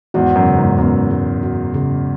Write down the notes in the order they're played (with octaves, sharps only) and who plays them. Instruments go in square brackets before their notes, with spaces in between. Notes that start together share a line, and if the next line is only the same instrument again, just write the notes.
[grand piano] E2 G#2 [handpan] F#4
[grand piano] F#2
[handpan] C#3
[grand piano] E2 G#2
[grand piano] F#2 [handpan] B3
[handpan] G#3
F#4
C#3